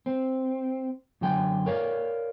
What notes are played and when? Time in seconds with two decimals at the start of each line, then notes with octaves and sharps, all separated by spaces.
0.06 C4
1.21 F#2 D3 G5 G#5
1.66 A#4 C#5 D5 F5